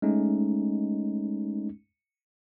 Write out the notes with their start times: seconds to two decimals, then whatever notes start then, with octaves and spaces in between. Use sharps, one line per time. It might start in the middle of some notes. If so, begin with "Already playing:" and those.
0.02 G#3 A3 C#4 D#4